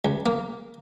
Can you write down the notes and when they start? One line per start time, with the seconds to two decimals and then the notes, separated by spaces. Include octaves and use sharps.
0.05 C#2
0.26 A#3